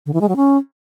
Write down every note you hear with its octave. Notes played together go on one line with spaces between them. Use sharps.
D3
E3
G#3
F#3
C#4